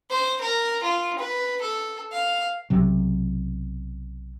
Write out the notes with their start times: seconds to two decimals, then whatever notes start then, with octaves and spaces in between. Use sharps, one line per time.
0.10 C5
0.41 A#4
0.83 F4
1.19 B4
1.61 A4
2.12 F5
2.70 B1 C3 F#3